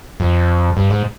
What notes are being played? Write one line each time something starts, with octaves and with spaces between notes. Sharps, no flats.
F2
G2
G#2